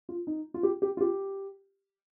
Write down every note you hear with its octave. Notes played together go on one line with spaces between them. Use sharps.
F4
D#4
F4
G4
G4
F4
G4